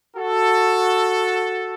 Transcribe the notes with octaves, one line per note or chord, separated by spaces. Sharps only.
F#4 A4